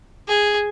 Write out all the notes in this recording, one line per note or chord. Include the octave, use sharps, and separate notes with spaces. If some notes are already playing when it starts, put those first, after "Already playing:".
G#4